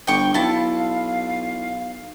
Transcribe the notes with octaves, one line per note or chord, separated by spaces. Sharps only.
G1 G5 C#6
B1 E4 F5 A5